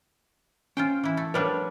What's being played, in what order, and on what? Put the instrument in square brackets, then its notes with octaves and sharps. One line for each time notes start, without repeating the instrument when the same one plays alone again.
[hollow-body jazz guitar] C#4 [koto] F4 C5 G5
[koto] E3 E4
A3
[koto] F3 G3 D4 [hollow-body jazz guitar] A#4 B4 C#5